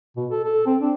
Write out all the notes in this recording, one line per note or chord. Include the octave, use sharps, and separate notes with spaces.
B2
A4
A4
C4
D4